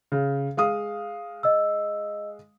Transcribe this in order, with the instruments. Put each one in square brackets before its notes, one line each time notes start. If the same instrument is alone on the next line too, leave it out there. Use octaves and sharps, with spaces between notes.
[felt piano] C#3
G#3 F5 D#6
[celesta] D#5 E6